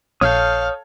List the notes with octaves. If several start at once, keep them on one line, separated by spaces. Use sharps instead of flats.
A#1 A4 C#5 F5 D#6 F6 G6